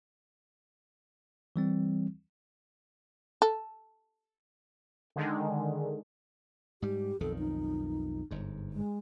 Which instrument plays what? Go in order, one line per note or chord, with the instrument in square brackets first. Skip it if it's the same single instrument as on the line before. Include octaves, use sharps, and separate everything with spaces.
[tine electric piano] E3 G3 C4
[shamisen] A4
[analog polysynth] D3 D#3 G#3
[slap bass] G#2 G3 [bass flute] G4
[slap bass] B1 F2 D#3 [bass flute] A4
[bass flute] D#4
[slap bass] G1 G#2
[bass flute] G#3